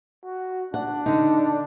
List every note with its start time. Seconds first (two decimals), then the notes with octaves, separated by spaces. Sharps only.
0.25 F#4
0.74 D4 F#5
1.06 D3 D#4